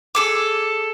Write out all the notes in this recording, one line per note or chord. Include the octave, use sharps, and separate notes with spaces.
G#4 A4 D6